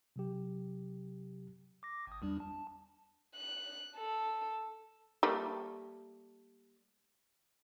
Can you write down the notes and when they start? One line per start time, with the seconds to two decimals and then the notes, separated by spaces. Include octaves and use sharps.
0.16 C3 F#3 G4
1.83 D6 A#6
2.07 G#1 D#6
2.22 E2 G3 D4
2.40 A5
3.35 F#6
3.96 A4
5.23 G3 A3 A#3